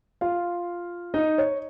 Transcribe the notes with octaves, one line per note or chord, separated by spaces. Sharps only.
F4 F5
D#4 D#5
C#5